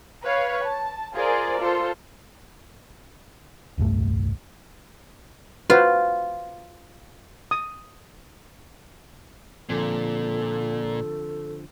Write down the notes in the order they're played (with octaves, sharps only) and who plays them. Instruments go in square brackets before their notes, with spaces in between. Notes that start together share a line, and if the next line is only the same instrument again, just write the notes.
[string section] B4 C#5 F5
A5
F4 G#4 A#4 C5 D5
F4 A4 C5
[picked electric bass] D#1 C2 G2 A3
[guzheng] F4 [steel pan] F#4 B4 C5
[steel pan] D#6
[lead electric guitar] A#2 [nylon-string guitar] D3 F3 C4 [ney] A4